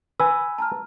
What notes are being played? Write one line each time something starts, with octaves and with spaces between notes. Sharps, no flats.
B4 G#5 E6
A5 A#5 F6